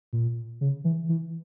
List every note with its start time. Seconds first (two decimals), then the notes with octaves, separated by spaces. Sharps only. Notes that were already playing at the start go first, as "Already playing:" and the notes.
0.13 A#2
0.61 C#3
0.84 E3
1.09 E3